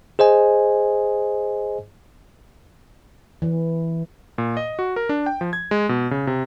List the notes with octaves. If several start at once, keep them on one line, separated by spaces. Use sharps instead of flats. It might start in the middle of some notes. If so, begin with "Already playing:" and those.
G#4 C5 D#5 G#5
E3
A#2
D#5
F#4
A#4
D4
G5
F3
G#6
G#3
B2
C#3
C3